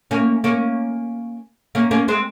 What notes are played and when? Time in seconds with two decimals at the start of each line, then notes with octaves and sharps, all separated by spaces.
0.11 A#3 C#4
0.44 A#3 C#4
1.75 A#3 C#4
1.91 A#3 C#4
2.08 G#3 C4